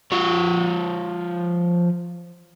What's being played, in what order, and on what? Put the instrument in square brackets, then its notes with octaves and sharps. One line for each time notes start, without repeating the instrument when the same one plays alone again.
[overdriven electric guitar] F3 C#5